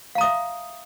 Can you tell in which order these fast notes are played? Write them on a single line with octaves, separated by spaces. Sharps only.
F5 A#5 D#6 E5